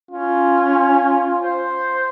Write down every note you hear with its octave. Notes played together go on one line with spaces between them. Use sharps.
C#4 F4
C5